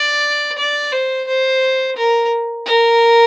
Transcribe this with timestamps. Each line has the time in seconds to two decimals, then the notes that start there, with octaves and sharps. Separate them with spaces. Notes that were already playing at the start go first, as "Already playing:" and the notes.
Already playing: D5
0.58 D5
0.92 C5
1.27 C5
1.96 A#4
2.66 A#4